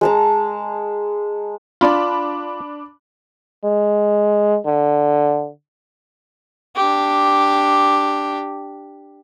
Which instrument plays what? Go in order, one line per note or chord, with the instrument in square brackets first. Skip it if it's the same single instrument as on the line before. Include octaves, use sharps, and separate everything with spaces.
[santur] G#3 A5 A#5
[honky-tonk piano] D4 B5 [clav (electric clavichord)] F4 D5
[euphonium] G#3
D3
[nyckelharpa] D4 G4